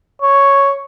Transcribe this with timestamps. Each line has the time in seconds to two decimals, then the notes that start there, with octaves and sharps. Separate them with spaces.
0.22 C#5